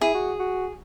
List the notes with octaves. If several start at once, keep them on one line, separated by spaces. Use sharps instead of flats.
E4 G#4
F#4
F#4